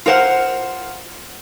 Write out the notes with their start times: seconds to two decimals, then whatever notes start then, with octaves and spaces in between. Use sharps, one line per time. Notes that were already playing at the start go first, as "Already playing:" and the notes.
0.06 F4 A#4 C5 F#5